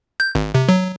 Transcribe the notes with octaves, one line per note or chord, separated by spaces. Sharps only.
G6
G#1
C3
F#3